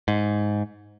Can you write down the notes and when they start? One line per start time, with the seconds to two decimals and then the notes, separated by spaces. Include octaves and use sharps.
0.08 G#2